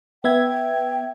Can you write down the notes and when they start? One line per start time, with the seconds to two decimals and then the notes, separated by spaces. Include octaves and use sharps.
0.24 B3 E5 G5 G#6